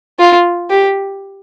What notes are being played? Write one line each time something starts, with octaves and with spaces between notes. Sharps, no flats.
F4
G4